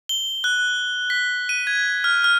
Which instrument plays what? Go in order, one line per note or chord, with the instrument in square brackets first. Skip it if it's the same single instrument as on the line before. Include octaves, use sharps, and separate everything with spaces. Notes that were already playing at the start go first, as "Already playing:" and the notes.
[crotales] G7
F#6
B6
D#7
G#6
F6
F6